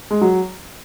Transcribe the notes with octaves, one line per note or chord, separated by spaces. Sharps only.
G#3
F#3